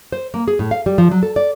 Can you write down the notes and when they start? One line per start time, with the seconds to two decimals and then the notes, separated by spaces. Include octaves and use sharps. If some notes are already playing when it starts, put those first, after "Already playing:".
0.12 C5
0.34 A#3
0.48 G#4
0.59 A2
0.71 F5
0.86 G3
0.98 F3
1.11 F#3
1.23 A4
1.36 D5